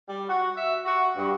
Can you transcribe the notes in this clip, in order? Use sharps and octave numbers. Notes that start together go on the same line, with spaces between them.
G3
F#4
E5
F#4
G2